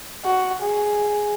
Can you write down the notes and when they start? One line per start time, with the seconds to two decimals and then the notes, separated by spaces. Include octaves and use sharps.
0.25 F#4
0.62 G#4